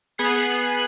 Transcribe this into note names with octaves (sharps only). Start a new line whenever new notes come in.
B3 G#4 F#6 C7